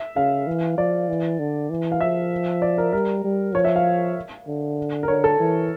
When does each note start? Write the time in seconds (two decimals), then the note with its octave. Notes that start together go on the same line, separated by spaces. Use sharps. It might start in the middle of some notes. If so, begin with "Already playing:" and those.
Already playing: E5
0.16 C#3 F5
0.47 E3
0.78 F3 D5
1.08 E3
1.39 D3
1.70 E3
1.92 F5
2.01 F3 E5
2.62 D5
2.78 A#4
2.93 G3 A#4
3.24 G3
3.54 F3 C#5
3.65 E5
3.76 F5
4.47 D3
5.03 A#4
5.08 D3 C#5
5.24 A4
5.39 E3